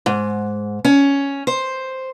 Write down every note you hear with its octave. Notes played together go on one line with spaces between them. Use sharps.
G#2
C#4
C5